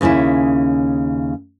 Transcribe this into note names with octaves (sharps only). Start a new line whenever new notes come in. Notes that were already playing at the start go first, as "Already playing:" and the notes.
D#2 C#3 C#4 E4 E5